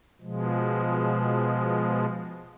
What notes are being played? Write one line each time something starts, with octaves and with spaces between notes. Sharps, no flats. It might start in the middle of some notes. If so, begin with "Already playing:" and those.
B2 F3 G#3